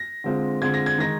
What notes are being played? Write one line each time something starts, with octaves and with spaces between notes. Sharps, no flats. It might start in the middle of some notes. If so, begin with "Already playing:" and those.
Already playing: A#6
D3 G#3 C4 F4
D3 G#3 C4 F4 G#6
A#6
G#6
D#3 G#3 D#4 A#6